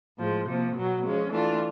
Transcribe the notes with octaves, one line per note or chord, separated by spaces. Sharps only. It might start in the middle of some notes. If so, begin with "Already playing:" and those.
A2 F3 G#3
C3 F3 A#3
B2 F#3 B3
F3 G#3 C#4
E3 A3 D4 F4